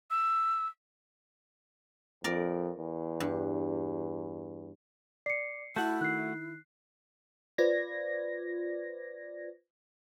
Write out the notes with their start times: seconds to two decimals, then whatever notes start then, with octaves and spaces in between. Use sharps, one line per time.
0.11 E6
2.24 F2 A#4 D5
2.78 E2
3.20 G2
5.26 D5 C7 C#7
5.76 A3 E4 F#4 F#5 A5 G6
6.01 D#3 F#6 C7
7.58 F4 B4 C5 D5 G#6 A#6